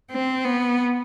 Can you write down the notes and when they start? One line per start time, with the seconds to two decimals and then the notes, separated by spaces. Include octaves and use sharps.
0.11 C4
0.45 B3